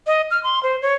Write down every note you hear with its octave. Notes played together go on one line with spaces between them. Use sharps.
D#5
F6
C6
C5
C#5